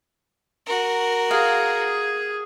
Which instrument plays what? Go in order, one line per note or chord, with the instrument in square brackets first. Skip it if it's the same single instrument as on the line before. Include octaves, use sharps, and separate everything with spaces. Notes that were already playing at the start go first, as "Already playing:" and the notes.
[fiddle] F#4 A#4
[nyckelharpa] G#4 [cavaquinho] F5